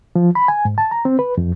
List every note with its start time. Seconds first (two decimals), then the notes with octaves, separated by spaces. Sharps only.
0.16 F3
0.35 B5
0.48 G#5
0.65 G#2
0.78 A5
0.91 A#5
1.05 C4
1.19 B4
1.38 F2